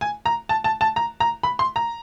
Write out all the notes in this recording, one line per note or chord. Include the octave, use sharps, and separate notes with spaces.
G#5
A#5
A5
A5
A5
A#5
A#5
B5
C6
A#5